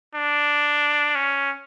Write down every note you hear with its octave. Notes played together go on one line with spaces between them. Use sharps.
D4
C#4